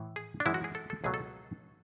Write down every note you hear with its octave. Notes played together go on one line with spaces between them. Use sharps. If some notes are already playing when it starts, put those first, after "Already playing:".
Already playing: A2 E3
G#4
D4
F#2 E3 G#3 B3 E4
F#4
G#4
A4
A4
C#2 B2 F#3 A3 G#4
A4